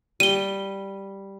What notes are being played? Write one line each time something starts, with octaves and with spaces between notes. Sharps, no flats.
G3 D#7 G7